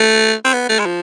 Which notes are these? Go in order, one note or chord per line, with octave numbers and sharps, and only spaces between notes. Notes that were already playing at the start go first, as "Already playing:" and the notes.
Already playing: A3
C4
B3
A3
G#3
F3